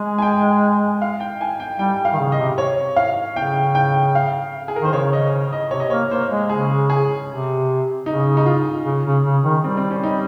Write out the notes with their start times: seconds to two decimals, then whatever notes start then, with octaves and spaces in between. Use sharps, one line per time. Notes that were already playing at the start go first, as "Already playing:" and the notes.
Already playing: G#3 G#5
0.18 G#5
0.22 G5
1.02 F5
1.20 G5
1.41 G#5
1.60 G5
1.79 G3 G5
2.05 F5
2.13 D#3
2.19 C#3
2.32 D#5
2.38 C3
2.58 C#5
2.96 F5
3.36 C#3 G5
3.75 G5
4.15 F5
4.68 G#4
4.76 A#4
4.82 D#3 C5
4.93 C#3 C#5
5.13 D#5
5.53 D#5
5.71 C3 C#5
5.80 D#5
5.90 A#3 C#5
6.11 A#3 C5
6.30 G#3
6.49 C#3 G#4
6.90 G#4
7.29 C3
8.06 C#3 D#4
8.37 D#4
8.46 F4
8.85 C#3
9.05 C#3
9.25 C#3
9.44 D#3
9.63 G3 C4
9.77 C4
9.91 C#4
10.03 D#4